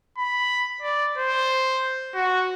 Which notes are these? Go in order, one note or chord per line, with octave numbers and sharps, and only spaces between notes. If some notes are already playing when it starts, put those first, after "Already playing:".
B5
D5
C5
F#4